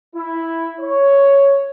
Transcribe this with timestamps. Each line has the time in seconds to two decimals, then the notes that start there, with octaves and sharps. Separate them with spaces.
0.16 E4
0.80 C#5